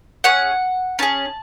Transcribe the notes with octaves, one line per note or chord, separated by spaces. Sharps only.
C#4 G#4 F#5
C#4 G#4 A5